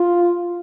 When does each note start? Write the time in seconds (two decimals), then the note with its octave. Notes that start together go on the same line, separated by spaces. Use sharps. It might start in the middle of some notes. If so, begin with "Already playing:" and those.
Already playing: F4